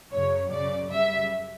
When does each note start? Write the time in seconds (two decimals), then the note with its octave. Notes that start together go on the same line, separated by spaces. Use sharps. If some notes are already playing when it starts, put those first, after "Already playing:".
0.12 F#2 C#3 F#3 C#5
0.51 F#2 C#3 F#3 D5
0.90 F#2 C#3 G3 E5